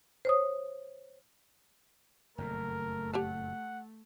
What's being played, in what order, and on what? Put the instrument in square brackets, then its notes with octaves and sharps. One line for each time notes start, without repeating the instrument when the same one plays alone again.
[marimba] C5 C#5 D#6
[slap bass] F#1 F2 A#2 [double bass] A3 [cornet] A#4
[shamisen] G4 C#5 A5 [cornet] F#5